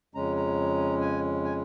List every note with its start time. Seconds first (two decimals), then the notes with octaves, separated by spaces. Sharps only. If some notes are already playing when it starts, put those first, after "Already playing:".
0.15 F2 C#3 G#3 C#4 A#5
0.36 A#5
1.01 G#5
1.44 G#5